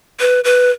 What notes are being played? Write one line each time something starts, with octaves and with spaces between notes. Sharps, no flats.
B4
B4